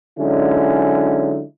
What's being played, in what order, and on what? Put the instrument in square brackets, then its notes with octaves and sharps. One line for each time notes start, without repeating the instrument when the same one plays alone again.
[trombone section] D3 F#3 G#3 C#4 D#4 E4